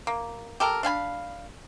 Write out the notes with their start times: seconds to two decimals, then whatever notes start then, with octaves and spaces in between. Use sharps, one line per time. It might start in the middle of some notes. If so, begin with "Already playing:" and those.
0.07 A#3
0.60 G4 A4 A#4
0.83 D4 F5 G#5 B5